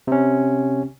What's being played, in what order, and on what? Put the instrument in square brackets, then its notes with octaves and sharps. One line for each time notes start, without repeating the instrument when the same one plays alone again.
[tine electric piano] C3 C#4